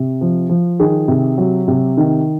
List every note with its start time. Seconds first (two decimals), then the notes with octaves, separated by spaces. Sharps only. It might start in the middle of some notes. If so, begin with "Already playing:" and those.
Already playing: C3
0.21 F3
0.49 F3
0.80 D#3 G#4
1.08 C3
1.38 F#3
1.68 C3
1.97 D#3